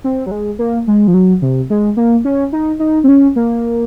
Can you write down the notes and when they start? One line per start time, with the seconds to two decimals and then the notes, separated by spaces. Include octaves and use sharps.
0.04 C4
0.26 F#3
0.31 G#3
0.59 A#3
0.87 G#3
1.08 F3
1.14 F#3
1.42 C3
1.70 G#3
1.97 A#3
2.25 C#4
2.53 D#4
2.79 D#4
3.04 C4
3.08 C#4
3.36 A#3